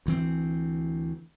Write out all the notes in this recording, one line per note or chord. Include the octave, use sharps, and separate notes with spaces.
D2 E3 C4